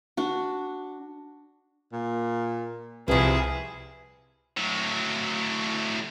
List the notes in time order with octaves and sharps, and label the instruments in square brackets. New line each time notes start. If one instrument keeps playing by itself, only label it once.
[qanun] D4 F#4
[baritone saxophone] A#2
[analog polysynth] C2 [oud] C3 B4 [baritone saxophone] F3 [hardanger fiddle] E4 G#4
[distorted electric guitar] A2 F#3